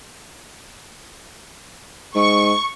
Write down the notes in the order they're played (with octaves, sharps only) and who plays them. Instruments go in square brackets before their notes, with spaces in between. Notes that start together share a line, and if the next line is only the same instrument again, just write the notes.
[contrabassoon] G#2 [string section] C#6